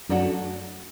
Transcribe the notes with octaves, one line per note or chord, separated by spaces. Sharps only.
F#2 F#3 A3 D4 F#4 A4